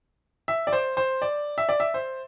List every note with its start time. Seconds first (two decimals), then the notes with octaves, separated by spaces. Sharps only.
0.48 E5
0.67 D5
0.73 C5
0.97 C5
1.22 D5
1.58 E5
1.69 D5
1.80 E5
1.94 C5